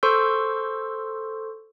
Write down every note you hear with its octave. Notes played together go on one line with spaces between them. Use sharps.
A4 C5 C6 C#6 E6 G6